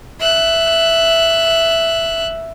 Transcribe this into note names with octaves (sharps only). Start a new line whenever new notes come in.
E5 F#6